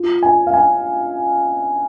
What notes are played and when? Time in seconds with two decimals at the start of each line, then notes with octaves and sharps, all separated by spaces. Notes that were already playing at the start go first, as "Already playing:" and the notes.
Already playing: F4
0.23 G#5
0.47 F5
0.54 G#5